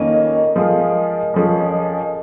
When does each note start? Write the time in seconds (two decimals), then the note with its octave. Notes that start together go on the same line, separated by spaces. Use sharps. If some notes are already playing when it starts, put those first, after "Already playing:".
Already playing: F2 D#3 A#3 C#4 A#4 D#5
0.56 F3 G#3 F4 G#4
1.34 F2 F3 C#4 G#4